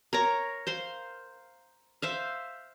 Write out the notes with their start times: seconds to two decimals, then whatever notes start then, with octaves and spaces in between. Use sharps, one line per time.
0.13 A#4 C#5 A#5
0.67 C5 F5 C6
2.02 C5 E5 F5